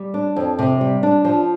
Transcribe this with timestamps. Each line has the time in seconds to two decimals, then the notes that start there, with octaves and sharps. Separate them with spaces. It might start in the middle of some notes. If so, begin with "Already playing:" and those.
Already playing: G3
0.14 D4
0.36 F2
0.59 C3
0.81 G3
1.03 D4
1.25 F3